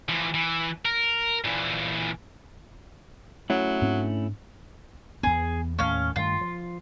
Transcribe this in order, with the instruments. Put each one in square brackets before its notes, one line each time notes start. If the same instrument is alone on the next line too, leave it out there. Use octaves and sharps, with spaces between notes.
[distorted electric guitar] E3 F3
E3
A#4
A#2 E3
[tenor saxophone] F#3 [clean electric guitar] A3 C#4 E4
[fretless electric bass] G#2 C4 D4
[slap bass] E2 B3 [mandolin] G#4
[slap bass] D#2 A2 A3 [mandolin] C#4 F5
[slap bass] G2 D#3 A3 [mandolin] F4
[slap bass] F3